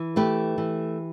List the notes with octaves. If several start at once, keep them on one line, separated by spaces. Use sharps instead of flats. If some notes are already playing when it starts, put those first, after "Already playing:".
Already playing: E3
A3 G4 B4
E3